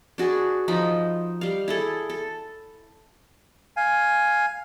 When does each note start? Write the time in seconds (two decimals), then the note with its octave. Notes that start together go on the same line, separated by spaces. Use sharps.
0.18 D4 F#4 G#4 B4
0.68 F3 D#4 B5
1.41 G3 F5
1.68 E4 G#4 A4
2.10 A4
3.76 F5 G#5